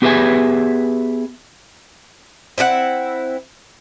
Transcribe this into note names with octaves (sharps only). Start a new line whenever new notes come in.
B3 G4 G#4 B4 E5 G#5
C4 E4 G#4 F#5